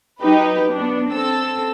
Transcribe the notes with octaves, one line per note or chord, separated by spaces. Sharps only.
F#3 D#4 G4 B4
B3 D4
C4 A4 E6